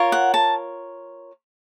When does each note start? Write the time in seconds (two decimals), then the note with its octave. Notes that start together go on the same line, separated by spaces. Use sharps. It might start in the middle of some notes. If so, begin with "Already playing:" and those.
Already playing: F4 A#4 C#5
0.12 F#5
0.34 A5